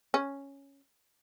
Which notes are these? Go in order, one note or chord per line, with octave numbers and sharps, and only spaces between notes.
C#4